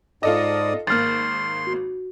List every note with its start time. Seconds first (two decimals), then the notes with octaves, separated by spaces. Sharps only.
0.23 G#2 F4 A4 D5 D#5 D#6
0.87 G#1 A#3 C6 F6 A6
1.67 F#4